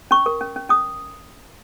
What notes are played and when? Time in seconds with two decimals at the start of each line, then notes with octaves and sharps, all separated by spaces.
0.11 C#4 C#6
0.26 A#4
0.41 C#4
0.56 C#4
0.69 C#4 D#6